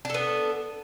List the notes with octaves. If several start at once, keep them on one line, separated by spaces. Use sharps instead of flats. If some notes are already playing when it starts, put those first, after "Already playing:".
B3 D4 A4